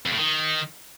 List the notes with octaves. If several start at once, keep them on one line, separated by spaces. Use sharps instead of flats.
F2
A2
D#3